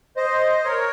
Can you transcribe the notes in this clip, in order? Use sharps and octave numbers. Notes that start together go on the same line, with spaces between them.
C5 D#5
A#4 C#5